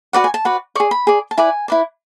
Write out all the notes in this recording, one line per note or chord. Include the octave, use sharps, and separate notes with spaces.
F#4 B4 D5 F#5
G#5
A5
F#4 B4 D5
G#4 D5 C#6
B5
G#4 D5
A5
E4 B4 D5 G#5
E4 B4 D5